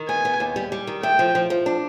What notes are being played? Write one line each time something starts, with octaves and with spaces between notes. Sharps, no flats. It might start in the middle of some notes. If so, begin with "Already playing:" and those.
Already playing: D#3
B3 G#5
B3
D#2
G3
G3
D#3
A3 G5
F3
F3
F3
D4